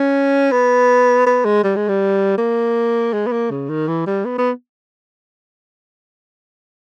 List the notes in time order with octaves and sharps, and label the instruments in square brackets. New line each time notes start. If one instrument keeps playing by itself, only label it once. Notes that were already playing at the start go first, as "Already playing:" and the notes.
Already playing: [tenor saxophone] C#4
B3
B3
G#3
G3
G#3
G3
A#3
G#3
B3
A#3
C#3
D#3
E3
G3
B3
B3